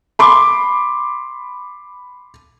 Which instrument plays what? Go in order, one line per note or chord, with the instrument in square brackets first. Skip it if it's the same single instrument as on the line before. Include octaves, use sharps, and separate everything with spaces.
[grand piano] B5 C6 D6